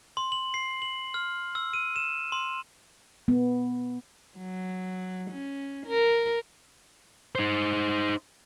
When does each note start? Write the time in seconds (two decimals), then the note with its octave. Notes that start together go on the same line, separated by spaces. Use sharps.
0.17 C6
0.32 F#7
0.54 C7
0.82 F#7
1.14 F6
1.55 E6
1.73 D#7
1.96 E7
2.32 C6
3.28 B3
4.37 F#3
5.31 C#4
5.87 A#4
7.35 D#4 C5